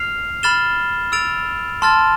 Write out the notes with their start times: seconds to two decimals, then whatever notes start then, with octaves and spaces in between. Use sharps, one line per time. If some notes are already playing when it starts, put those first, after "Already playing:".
Already playing: F6 C7 F7
0.43 B5 F6 A6 E7 G7
1.12 E6 A6 D7 F7
1.82 A5 C6 F6 A6